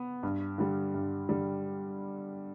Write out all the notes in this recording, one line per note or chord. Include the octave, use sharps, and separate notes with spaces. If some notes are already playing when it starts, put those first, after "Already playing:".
Already playing: B3
G2
D3 G3
G2
D3 G3